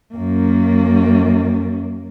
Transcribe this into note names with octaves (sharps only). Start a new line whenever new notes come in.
F#2 A#3